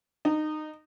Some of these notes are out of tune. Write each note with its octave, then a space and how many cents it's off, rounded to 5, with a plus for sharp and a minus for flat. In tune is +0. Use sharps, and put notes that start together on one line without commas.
D#4 -20